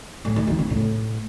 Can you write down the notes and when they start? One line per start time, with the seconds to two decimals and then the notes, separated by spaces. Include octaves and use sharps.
0.25 A2
0.36 D#3
0.47 D#3
0.59 C#3
0.70 A2